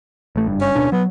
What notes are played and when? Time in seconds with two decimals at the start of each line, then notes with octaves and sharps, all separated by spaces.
0.36 A1 A3
0.47 F#1 G2
0.61 C#4
0.75 D1 B2 D4
0.92 F#3 B3